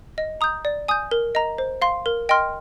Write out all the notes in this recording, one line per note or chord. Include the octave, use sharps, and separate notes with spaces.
D#5
A#5 D#6 G6
D5
G#5 D#6 G6
A#4
D#5 A#5
C5
F5 C6
A#4
D#5 G5 C6 F6